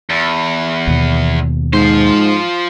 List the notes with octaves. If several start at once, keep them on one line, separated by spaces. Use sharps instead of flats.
E2
D#2 B2
G#2 F3 C5